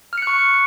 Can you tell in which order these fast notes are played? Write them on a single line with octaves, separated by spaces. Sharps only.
F6 C#7 F#6 C#6